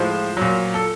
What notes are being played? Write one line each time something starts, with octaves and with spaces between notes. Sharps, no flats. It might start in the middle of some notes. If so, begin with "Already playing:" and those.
Already playing: A2 F3 G#3 C5
A#2 F#3
A4